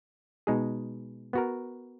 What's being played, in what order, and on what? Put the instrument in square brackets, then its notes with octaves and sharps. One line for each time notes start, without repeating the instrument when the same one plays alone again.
[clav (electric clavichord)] B2 G#3 D#4 G#4
B3 F#4 A#4